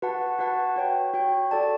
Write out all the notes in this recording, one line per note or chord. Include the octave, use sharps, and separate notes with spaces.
F#4 B4 F#5 A5
F#4 B4 F#5 A5
F#4 C#5 G5
F#4 C#5 G5
F#4 A4 D5 A5